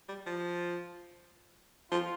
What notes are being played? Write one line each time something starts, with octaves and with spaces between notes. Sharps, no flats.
G3
F3
F3 F4